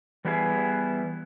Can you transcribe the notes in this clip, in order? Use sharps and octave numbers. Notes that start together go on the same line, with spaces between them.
E3 G3 B3 E4 G4 G#4